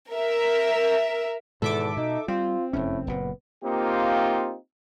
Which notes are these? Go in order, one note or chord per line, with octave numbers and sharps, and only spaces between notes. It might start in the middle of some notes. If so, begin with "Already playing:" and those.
A#4 E5
E2 G#2 B2 D#3 A4 E5 D6
B2 D#4
G3 C4 F4
F1 F#2 A2 C#4
F#1 A#2 B3
A#3 C4 D#4 F4 G4